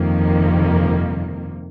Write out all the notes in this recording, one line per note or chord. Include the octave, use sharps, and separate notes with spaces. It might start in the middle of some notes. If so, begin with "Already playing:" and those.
Already playing: G1 F2 C3 D#3 A#3